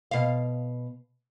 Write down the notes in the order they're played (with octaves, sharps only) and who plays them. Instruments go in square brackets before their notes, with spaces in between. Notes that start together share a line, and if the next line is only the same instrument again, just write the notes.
[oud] B2 F5